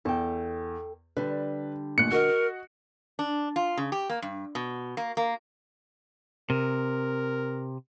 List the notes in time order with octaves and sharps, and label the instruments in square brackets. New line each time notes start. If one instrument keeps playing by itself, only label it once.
[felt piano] E2 [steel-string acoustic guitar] A4 G5
[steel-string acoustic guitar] D3 G3 [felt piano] B4
[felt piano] A1 A#2 F#6 [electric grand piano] C#7
[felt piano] F#4 D#5 [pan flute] A#4
[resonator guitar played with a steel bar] D4
F4
C#3
G4
A#3
G2
B2
A#3
A#3
[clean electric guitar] C3 [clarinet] A#4